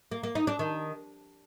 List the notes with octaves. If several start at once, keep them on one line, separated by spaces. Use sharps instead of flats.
A#3
A#3
D#4
D4
D#3